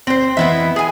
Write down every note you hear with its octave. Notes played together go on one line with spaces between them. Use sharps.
D2 C4 C5
F2 E3 B3 E4 D#5 E5
G#4 G#5